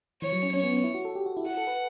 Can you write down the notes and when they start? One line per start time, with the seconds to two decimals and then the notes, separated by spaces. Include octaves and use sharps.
0.22 E3 C#5
0.32 F#3
0.43 C#4
0.53 C#4 C#5
0.63 B3
0.74 C#4
0.84 E4
0.94 F#4
1.05 A4
1.15 G4
1.26 F#4
1.37 E4
1.46 F#4 F#5
1.57 A4
1.67 B4